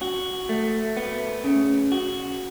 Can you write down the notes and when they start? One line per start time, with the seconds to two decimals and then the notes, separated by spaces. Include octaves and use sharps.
0.02 F#4
0.49 A3
0.97 B3
1.44 C#3
1.92 F#4